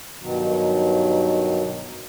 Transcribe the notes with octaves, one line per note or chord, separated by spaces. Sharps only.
G2 B2 D#3 F#3